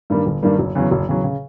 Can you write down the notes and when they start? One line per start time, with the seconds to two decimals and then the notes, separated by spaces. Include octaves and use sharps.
0.10 G2 D#3 G3 A#3
0.26 G1
0.42 G2 D#3 G3 A#3
0.59 F#1
0.75 E2 C#3 F#3
0.91 F#1
1.08 E2 C#3 F#3
1.24 C#3